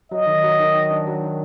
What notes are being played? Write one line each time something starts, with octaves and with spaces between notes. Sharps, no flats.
F#3 D#5
D#3
F#3
D#3
D#3
D4
F#3
D#3